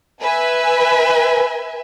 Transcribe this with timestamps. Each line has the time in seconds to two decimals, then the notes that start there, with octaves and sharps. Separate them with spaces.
0.24 B4 E5 G#5